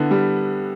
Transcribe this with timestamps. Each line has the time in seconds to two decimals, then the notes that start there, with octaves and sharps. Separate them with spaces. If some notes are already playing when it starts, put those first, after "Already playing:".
Already playing: D3 B3 E4
0.11 G3